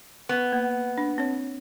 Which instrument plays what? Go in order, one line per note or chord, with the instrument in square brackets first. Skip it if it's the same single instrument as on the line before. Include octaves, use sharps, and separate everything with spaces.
[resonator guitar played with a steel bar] B3
[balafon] A#3
D4
C4 C#5